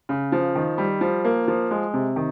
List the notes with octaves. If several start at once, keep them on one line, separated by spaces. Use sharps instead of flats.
C#3
F3
D#3
G3
F3
A#3
F3
G#3
C3
D#3